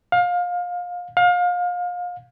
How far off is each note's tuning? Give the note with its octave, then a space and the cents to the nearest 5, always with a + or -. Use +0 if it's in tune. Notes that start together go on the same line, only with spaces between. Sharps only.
F5 +25
F5 +30